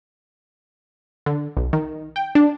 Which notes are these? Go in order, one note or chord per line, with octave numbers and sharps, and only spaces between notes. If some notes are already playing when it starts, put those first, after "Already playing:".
D3
B1
D#3
G5
D4